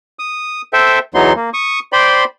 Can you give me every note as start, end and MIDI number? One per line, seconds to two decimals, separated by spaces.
0.19 0.62 87
0.73 0.99 69
0.73 0.99 72
0.73 0.99 76
0.73 0.99 79
1.14 1.33 40
1.14 1.33 52
1.14 1.33 54
1.14 1.33 59
1.14 1.33 63
1.14 1.33 84
1.36 1.50 58
1.54 1.79 85
1.54 1.79 87
1.93 2.24 72
1.93 2.24 74
1.93 2.24 79
1.93 2.24 83
1.93 2.24 84